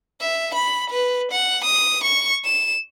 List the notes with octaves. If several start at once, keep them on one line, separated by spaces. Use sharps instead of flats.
E5
B5
B4
F#5
D#6
C#6
E7